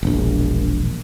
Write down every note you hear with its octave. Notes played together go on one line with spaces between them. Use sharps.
E1 A#1